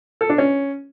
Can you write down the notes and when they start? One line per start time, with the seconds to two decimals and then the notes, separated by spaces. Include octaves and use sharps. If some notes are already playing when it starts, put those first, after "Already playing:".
0.21 A4
0.30 D4
0.38 C#4